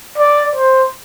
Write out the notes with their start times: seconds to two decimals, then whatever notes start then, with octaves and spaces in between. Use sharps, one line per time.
0.18 D5
0.55 C5